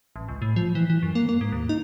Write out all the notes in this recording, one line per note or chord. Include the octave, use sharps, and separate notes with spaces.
A1
C#2
A2
F3
E3
E3
F#2
A#3
A#3
G#2
D#2
D#4